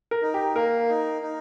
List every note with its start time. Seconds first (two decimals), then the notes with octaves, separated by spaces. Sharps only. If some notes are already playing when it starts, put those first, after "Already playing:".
0.11 A#4
0.22 D#4
0.34 G4
0.55 A#3 A#4
0.89 D#4
1.21 D#4